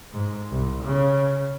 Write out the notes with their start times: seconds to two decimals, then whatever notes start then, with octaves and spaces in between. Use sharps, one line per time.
0.13 G#2
0.51 C2
0.84 C#3